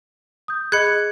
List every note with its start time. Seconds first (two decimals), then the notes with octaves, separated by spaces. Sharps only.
0.48 D#6 G6
0.72 G#4 D#5 B5 F#6 G#6 C#7